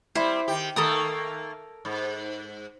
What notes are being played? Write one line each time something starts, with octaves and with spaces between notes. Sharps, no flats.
G3 C4 E4 C5
D#3 G4
D#3 A3 A#3 A4 A#4 D#6
G#2